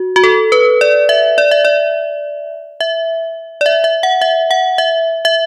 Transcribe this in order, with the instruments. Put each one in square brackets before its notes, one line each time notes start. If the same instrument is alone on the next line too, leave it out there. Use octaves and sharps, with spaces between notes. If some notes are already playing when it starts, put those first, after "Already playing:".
Already playing: [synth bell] F#4
F#4
A4
B4
D5
E5
D5
E5
D5
E5
D5
E5
E5
F#5
E5
F#5
E5
E5